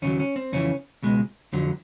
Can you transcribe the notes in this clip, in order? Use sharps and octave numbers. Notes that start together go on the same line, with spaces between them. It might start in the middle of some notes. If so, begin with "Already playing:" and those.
D#2 C#3 F#3 C#4
C#4
C4
F2 C#3 E3 C#4
C#2 B2 G#3
F2 D3 F#3